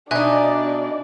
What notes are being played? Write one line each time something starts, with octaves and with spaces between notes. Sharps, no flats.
B2 D4 D#4 D5 E5 G#5 F#6